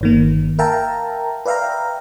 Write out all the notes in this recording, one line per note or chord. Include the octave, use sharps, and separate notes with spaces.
G1 D#3 A#3
A#4 E5 F5 G5 A5 A#5
B4 D5 E5 F5 G5 A#5